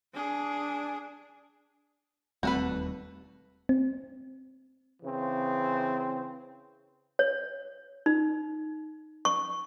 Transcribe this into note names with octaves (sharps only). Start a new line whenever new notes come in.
D4 G#4
E1 D#2 G3 A3 C4 F#4 A4 B4
C4
C#3 E3 C4
C#5
D#4
C#6